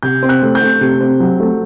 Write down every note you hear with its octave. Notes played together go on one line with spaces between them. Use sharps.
C3 G6
C4
F#6
A3
G6
A3
C3
C4
F#3
A3